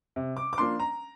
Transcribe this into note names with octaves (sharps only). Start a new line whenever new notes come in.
C3
D6
D6
F3 A#3 D4 C6
A#5